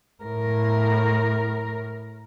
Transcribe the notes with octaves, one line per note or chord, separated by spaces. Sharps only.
A2 A#4